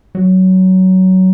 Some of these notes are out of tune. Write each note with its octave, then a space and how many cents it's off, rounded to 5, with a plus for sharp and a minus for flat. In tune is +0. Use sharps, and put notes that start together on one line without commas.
F#3 +15